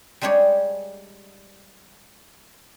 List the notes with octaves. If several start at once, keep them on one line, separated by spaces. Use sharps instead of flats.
G3 G#3 D4 G4 C#5